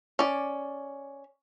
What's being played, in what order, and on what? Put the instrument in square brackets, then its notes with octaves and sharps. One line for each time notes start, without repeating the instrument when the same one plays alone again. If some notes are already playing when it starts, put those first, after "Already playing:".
[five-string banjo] C#4 D5